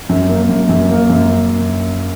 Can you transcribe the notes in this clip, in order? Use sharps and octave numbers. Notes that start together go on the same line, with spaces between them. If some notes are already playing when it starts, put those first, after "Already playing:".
F#2
A#3
F#2
F#2
A#3
F#2